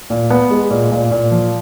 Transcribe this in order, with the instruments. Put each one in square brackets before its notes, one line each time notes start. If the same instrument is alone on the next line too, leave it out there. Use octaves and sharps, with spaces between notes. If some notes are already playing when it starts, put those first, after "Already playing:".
[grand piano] A#2
B3
G#3
A#2
A#2
A#2
F3